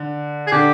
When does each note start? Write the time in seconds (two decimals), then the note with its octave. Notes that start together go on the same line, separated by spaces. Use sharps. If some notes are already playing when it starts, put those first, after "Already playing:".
Already playing: D3
0.47 G#4
0.52 D3 G4